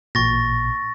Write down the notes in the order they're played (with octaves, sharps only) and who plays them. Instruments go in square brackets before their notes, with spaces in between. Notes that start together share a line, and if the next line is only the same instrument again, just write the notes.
[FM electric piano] A1 A#2 [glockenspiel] C#6 A6 A#6